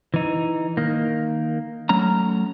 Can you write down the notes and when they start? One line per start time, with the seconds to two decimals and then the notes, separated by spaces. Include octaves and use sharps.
0.14 E3 D#4
0.77 D#3 A#3
1.89 F#3 A3 C#4 A#5